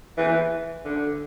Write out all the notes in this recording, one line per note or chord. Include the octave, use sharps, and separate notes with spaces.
E3
D3